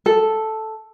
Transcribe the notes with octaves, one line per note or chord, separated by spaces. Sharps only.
A4